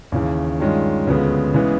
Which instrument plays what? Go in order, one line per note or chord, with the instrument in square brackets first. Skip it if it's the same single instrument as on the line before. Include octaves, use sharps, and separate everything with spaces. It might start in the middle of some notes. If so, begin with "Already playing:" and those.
[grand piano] D#2 C#3 E3
G2 D#3 G#3 C#4 F4
D2 C#3 F3 G#3 B3
C#3 E3 G#3 B3